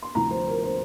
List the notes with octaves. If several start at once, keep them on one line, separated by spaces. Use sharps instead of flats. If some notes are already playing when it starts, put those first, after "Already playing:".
C6
D2 C3 F3 A#5
C5
A#4
C5